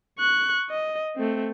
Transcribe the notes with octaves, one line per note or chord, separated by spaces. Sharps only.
C#6 F#6
D#5
A3 C4